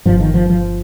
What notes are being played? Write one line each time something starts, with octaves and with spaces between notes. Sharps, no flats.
G1 G2 F3
D#3
F3
F3